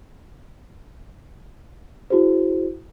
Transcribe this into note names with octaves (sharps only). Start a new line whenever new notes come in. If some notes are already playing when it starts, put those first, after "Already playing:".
E4 F#4 G#4 C5